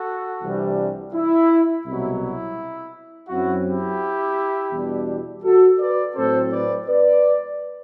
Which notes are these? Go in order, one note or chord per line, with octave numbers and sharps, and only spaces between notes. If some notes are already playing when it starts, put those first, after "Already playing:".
Already playing: F#4 A4
C2 C3 E3 G3 D4
E4
C2 B2 F#3 E4
E4
F#2 F#3 C4 E4 F#4
E4 G4
E2 B2 G3 D4
F#4 A4
B4 D5
A2 F#3 C4 A4 C5
B4 D5
B4 D5